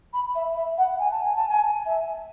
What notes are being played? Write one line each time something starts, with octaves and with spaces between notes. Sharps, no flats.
B5
E5
E5
F#5
G#5
A5
G#5
A5
G#5
E5